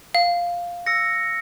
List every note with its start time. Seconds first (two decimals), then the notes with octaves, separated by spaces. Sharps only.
0.15 F5
0.86 E6 A#6 C#7